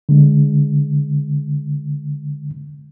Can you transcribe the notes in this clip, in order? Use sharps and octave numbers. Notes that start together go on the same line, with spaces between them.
D3 G#3